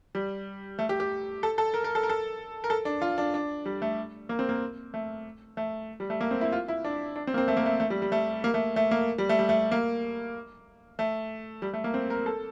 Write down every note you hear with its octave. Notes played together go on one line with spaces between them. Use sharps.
G3
A3
G4
G4
A4
A4
A#4
A#4
A4
A#4
A4
A#4
A4
D4
F4
D4
D4
G3
A3
A#3
C4
A#3
A3
A3
G3
A3
A#3
C4
E4
F4
E4
D4
D4
C4
A#3
C4
A3
A#3
A3
A3
G3
G3
A3
A#3
A3
A3
A#3
G3
A3
G3
A3
A#3
A3
G3
A3
A#3
C4
A#4
A4